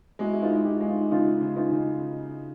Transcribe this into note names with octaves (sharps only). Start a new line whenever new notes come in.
G#3 E4 F#4
E4
D#4 F4
G#3
F4 G4
G#3
D#4 F4
C#3 D#4 F4
C#3
D#4 F4
C#3